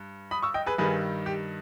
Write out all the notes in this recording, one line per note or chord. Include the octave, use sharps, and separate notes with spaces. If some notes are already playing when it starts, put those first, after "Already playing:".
Already playing: G2
B5 D#6
C#6 E6
D#5 G5
G#4 B4
G2 D#3 G3 G#4 B4
G4